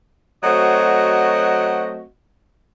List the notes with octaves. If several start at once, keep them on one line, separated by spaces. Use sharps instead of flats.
F#3 A3 C4 F#4 D#5